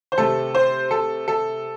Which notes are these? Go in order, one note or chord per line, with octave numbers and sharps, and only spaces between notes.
C5
C3 A3 C4 A4
C5
A4
A4